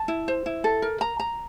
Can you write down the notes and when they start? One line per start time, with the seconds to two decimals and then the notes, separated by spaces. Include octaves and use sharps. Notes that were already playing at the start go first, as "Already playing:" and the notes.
Already playing: A5
0.08 E4
0.28 C5
0.46 E4
0.64 A4
0.82 A#4
1.01 A#5
1.19 A#5